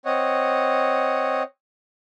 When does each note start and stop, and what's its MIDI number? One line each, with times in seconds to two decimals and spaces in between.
0.06 1.43 60
0.06 1.43 73
0.06 1.43 75
0.06 1.43 78